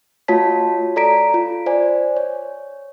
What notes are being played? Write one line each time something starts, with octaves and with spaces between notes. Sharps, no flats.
A3 F4 F#4 C#5 A5 B6
A4 D5 A#5 B6 D7
F4
C5 D5 G#5
C#5